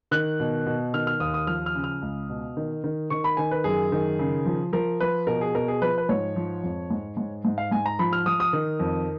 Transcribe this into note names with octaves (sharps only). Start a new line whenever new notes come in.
D#3 F#6
B2
B2
D#3 F6
F6
D#2 D#6
D#6
F3 F6
F6
C#3
F6
C#2
B2
D#3
D#3
D#3 C#6
B5
D#3 G#5
B4
F#2 G#4
D#3
C#3
F3
F3 A#4
F3 B4
B2 A#4
G#4
B2 A#4
G#4
F3 B4
B4
G#2 C#5
F3
F2
G#2
G#2
G#2
F5
G#2 G#5
A#5
F3 B5
F6
F3 D#6
D#6
D#3
F2